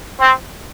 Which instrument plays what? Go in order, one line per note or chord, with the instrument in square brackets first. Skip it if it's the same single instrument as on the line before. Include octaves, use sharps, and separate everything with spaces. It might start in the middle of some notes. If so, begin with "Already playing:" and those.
[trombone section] C4